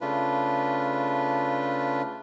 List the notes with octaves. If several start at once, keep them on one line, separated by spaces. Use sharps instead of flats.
C#3 A3 D4 F4 B4